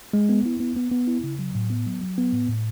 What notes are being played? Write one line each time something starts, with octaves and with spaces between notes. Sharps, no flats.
G#3
B3
E4
B3
B3
B3
E4
C#3
F#3
A2
B3
F#3
F#3
B3
A2
A2